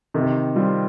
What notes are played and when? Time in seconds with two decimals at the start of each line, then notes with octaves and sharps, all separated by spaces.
0.14 C3 D#3
0.56 G3 C4 F4